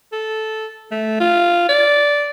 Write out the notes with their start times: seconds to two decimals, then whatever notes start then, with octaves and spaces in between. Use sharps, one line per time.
0.12 A4
0.91 A3
1.20 F4
1.69 D5